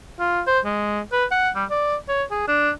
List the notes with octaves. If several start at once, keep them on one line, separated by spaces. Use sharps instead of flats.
F4
C5
G#3
B4
F#5
G3
D5
C#5
G#4
D4